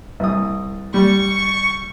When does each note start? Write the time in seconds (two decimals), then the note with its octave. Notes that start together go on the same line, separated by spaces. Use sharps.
0.20 C2 D#6
0.94 G3 C#6